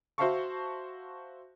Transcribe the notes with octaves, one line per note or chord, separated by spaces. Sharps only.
F#4 C5 E5 F5 A5 C#6